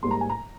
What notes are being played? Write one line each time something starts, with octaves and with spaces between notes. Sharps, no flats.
G#2 G3 A#3 C6
A#5
G#5
A#5